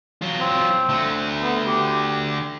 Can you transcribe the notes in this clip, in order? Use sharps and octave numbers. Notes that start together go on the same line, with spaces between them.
F#3 F4
C4
D3 A3
B3
G4